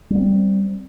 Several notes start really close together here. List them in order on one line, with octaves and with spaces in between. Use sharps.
G3 A#3 C4